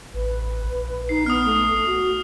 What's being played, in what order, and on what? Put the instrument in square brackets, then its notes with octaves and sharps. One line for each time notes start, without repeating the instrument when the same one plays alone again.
[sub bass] A1 [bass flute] B4
[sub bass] A#1
[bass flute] D#4 [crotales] C7
[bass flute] B3 [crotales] D#6 F6
[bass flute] A3
F#4